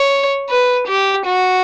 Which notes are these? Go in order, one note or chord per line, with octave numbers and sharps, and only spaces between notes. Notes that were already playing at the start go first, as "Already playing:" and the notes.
Already playing: C#5
B4
G4
F#4